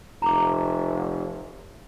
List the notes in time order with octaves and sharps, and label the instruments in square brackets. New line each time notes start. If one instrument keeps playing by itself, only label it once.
[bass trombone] F1 [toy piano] A#5 D6